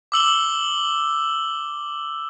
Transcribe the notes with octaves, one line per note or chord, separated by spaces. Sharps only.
D6 E6 F#7 G7